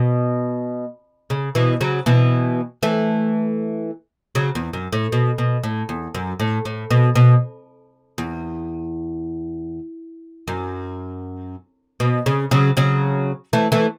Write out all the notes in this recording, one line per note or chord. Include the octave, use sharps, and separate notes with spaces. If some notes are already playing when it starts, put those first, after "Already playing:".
Already playing: B2
C#3
B2 E3
C#3 F#3
B2 E3
E3 A3
C#3 F#3
E2
F#2
A2
B2
B2
A2
E2
F#2
A2
A2
B2
B2
E2
F#2
B2
C#3
C#3 F#3
C#3 F#3
E3 A3
E3 A3